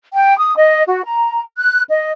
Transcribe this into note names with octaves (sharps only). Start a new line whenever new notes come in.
G5
D#6
D#5
F#4
A#5
F#6
D#5